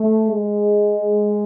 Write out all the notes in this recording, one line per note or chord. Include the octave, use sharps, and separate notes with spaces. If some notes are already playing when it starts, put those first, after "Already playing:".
Already playing: A3
G#3